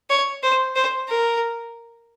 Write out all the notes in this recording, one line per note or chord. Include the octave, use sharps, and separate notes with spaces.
C#5
C5
C5
A#4